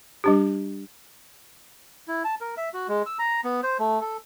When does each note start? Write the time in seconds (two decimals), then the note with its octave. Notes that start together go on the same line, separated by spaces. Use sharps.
0.24 G3 D4 G4
2.08 E4
2.24 A5
2.41 A#4
2.57 E5
2.74 F#4
2.88 G#3
3.06 E6
3.19 A#5
3.44 B3
3.63 C5
3.79 A3
4.01 A4